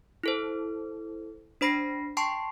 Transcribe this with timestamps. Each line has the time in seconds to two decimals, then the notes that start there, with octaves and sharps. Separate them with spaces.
0.23 E4 A4 C5
1.61 D4 C5 B5 A#6 C7
2.17 G5 A5 C6 C#6 C7